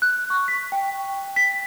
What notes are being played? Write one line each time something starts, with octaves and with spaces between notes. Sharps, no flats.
F#6
C#6
B6
G5
B6